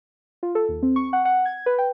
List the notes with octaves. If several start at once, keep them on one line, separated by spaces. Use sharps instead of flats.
F4
A4
D#2
C4
C#6
F#5
F#5
G#6
B4
G5